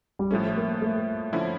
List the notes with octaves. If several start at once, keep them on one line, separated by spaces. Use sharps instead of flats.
G3
A2 F3 A3 C#4
A#3
A3
D3 F3 C#4 E4